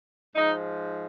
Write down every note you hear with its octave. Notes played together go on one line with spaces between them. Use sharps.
G#2 F3 G#3 D#4